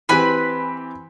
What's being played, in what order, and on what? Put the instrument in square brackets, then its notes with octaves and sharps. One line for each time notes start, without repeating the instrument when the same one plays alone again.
[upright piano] E3 C4 G4 [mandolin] B4 G#5 B5